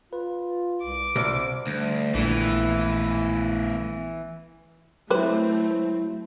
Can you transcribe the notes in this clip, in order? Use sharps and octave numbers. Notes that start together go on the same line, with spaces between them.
F4 B4
C2 D6
C2 B2
D2 G3
A#1 E3 A3 B3 E4
F#3 A3 C4 E4 G4 B4 C5